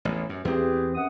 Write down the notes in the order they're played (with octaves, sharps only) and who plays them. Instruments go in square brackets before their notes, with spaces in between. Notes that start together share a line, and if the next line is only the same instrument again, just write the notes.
[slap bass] A1 E2
F#2
[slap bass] E2 C4 [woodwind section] G4 G#4 B4
[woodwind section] F#2 F#5 D#6